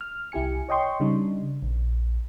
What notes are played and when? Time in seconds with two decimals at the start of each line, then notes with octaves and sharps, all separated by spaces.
0.01 F6
0.32 C2 E4 G4 G#5 C#7
0.69 C#5 D#5 G5 C6 C#6
1.00 C#3 G3 D4 D#4
1.63 A#1